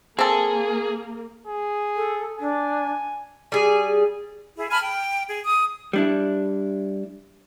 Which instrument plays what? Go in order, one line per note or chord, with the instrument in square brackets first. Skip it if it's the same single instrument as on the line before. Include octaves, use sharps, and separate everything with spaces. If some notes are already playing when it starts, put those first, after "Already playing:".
[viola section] A#3 [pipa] C4 A4 [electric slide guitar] G#4
[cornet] G#4
[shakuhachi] A4
[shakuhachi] D4 [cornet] G#5
[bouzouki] G3 G#4
[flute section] E4 G#4
G#5 A5 B5 F6
G5
G#4
D#6
[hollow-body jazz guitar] G3 D4 E4